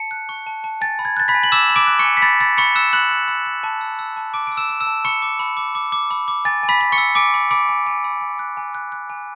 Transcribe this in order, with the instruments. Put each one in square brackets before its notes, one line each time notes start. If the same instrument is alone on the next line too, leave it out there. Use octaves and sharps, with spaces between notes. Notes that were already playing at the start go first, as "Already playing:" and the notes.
Already playing: [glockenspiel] A5 C#7
F#6
C#6
A5
A5
G#5 A6
B5
G#6
F#6 A6
B5 B6
G#5
F#7
D6 E6 E7
B5
D6 D7
F#6
C#6 C#7
G#5
B6
B5 A6
B5 A6
B5 C#6 C#7
E6 F#6 E7
B5 F#6 F#7
B5
B5
F#6
A5
E6
E6
A5
A5 D6 D7
E6 D7
E6 E7
E6
E6 E7
A5
B5 C#6 C#7
D6
B5
D6
D6
D6
B5
D6
G#5 A6
G#5
B5 B6
B5
C#6 C#7
E6
G#5 D6 D7
B5
B5 D6 D7
G#5
G#5
B5
G#5
F#6
G#5
F#6
F#6
G#5